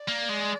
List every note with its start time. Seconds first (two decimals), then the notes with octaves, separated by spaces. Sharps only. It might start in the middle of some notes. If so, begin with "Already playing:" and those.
Already playing: D5
0.08 A#3
0.30 G#3